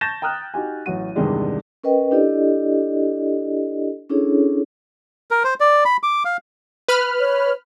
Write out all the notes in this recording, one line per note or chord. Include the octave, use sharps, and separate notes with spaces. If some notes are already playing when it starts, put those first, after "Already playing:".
A5 C#6 G6 A6 A#6 E7
G5 A#5 D#6 F6 F#6
D#4 F#4 G4 G#5
A1 F#3 F#4 D#7
E2 G2 C3 D#3 G#3 D4
C#4 A#4 B4 D#5 G5
D4 E4 G4 A4 D5 D#5
C#4 D4 E4 G#4 A4 C#5
A#4
C5
D5
B5
D6
F5
B4 B5 F6
C#5